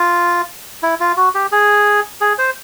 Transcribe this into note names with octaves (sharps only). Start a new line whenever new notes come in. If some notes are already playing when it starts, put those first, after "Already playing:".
Already playing: F4
E4
F4
F#4
G4
G#4
G#4
C5